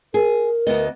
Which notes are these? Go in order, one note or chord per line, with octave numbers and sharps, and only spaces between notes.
G#4 A#4
D2 B3 D#5